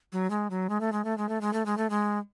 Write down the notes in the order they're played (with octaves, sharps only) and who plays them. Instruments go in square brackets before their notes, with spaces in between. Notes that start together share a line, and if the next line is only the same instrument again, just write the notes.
[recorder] F#3
G#3
F#3
G#3
A3
G#3
A3
G#3
A3
G#3
A3
G#3
A3
G#3